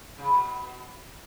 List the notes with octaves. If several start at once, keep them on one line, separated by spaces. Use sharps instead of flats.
C#3
B2